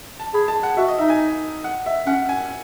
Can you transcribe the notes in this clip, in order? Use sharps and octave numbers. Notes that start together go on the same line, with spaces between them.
A5
G#4 B5
A5
F#5
F#4 E5
D#5
D#4 E5
G#5
F#5
E5
C#4 F#5
G#5